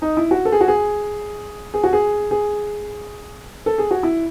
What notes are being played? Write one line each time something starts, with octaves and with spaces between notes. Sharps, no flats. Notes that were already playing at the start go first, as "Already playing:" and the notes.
D#4
E4
F#4
A4
G#4
F#4
G#4
G#4
F#4
G#4
G#4
A4
G#4
F#4
E4